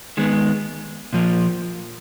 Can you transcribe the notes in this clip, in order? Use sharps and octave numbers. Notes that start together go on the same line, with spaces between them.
D#3 G#3 B3
A#2 F3 A#3